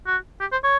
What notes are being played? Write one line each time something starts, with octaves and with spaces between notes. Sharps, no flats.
F#4
G4
C5
C#5